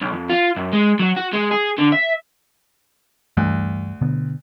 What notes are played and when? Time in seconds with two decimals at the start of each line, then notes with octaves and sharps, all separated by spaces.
0.01 B1
0.13 F2
0.29 F4
0.56 F#2
0.73 G#3
1.00 F#3
1.16 F#4
1.33 G#3
1.51 G#4
1.78 D3
1.92 E5
3.37 D2 G2 E3 G3
4.01 B2 D3 B3